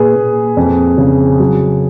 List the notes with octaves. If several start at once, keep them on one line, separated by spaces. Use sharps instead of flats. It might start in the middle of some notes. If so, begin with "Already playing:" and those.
Already playing: A#2 G#4 B4
A#2
F2
C#3
F#3